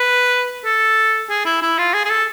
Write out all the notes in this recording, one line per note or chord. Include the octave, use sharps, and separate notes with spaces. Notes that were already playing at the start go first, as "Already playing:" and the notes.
Already playing: B4
A4
G#4
E4
E4
F4
G#4
G#4
A4